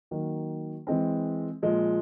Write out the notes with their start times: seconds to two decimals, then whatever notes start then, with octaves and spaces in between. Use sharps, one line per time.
0.11 D#3 F#3 A#3
0.87 E3 G#3 C4
1.62 A#2 F3 G#3